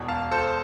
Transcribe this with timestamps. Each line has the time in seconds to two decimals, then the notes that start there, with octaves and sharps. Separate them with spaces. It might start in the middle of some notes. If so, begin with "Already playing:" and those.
Already playing: E1 E2 B2
0.08 F5 A5
0.31 A4 C5